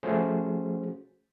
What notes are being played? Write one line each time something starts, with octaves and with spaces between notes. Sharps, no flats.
F3 A3 C#4 F#4 G#4 C5